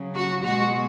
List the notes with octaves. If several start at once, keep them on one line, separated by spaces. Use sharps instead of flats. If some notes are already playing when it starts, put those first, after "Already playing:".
Already playing: C#3 F#3
F#4
B2 G#3 F#4